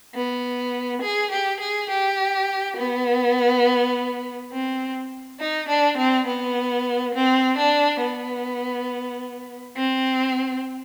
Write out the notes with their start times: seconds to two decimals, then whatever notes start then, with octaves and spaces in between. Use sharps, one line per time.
0.15 B3
1.02 G#4
1.31 G4
1.60 G#4
1.90 G4
2.77 B3
4.52 C4
5.40 D#4
5.68 D4
5.98 C4
6.27 B3
7.14 C4
7.58 D4
8.02 B3
9.77 C4